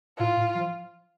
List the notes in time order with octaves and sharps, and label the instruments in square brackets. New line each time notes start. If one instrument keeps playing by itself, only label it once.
[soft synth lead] A2 [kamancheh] F4
[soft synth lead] A2
F3